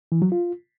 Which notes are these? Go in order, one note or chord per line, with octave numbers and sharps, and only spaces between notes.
E3
F#3
F4